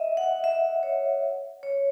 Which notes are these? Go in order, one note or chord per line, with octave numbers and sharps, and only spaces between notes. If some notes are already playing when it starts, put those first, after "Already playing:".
Already playing: D#5 E5
F#5
E5
C#5
C#5